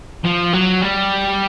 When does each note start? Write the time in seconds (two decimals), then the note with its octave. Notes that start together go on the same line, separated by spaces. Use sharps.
0.25 F3
0.53 F#3
0.81 G3